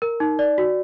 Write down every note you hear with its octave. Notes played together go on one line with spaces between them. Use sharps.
A#4
D#4
D5
F#4